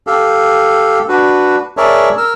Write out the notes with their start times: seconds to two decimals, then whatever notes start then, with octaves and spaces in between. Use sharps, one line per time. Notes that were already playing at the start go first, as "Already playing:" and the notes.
0.07 G4 A4 F5
1.08 D4 F#4 B4
1.77 G#4 A#4 C#5 D5 E5 A5
2.17 A#4 E6 F6